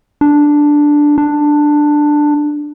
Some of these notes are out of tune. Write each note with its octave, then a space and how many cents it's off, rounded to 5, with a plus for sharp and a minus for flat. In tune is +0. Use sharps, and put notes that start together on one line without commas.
D4 +0
D4 +10